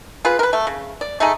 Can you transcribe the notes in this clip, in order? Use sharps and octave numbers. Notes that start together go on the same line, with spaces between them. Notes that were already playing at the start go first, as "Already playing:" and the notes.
F4 G#4 B4
A#4 B4
A3
C#3
D5
A3 D#4 G#4